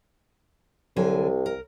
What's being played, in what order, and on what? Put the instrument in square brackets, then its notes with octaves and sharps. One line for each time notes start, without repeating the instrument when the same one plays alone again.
[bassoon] C2 [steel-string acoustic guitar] D3 F#3 G#5
[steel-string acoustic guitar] A#4